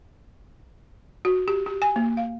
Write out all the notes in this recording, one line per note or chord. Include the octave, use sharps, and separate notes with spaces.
F#4
G4
G4
G#5
A#3
F5